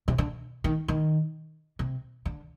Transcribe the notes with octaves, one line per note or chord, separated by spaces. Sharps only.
C3
D3
D#3
D#3
C3
D3